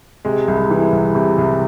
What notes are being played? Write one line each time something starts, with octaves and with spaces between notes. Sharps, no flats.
C3 G#3
C2
E3
C2
C3
C2